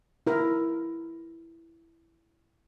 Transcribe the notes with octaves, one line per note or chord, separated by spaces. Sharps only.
E4 A#4